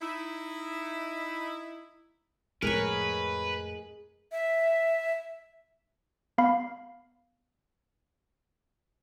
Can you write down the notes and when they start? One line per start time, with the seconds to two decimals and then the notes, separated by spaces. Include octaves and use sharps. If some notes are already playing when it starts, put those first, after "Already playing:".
0.01 D#4 E4
2.62 F2 A2 G#3 G#4 A#4 B4 C#5
4.32 E5
6.38 B3 F5 B5